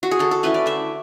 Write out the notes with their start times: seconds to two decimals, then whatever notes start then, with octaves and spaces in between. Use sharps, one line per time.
0.03 F#4
0.11 G#4
0.19 D3 A4
0.31 A4
0.43 A3 C#4 E4 B4
0.54 D5
0.66 D3 E5